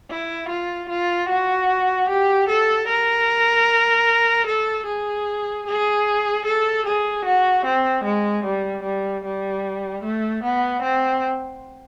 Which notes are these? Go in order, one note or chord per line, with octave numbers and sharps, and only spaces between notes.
E4
F4
F4
F#4
G4
A4
A#4
A4
G#4
G#4
A4
G#4
F#4
C4
G#3
G3
G3
G3
A3
B3
C4